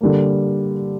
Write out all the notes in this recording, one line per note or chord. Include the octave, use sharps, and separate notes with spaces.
D3 G3 A#3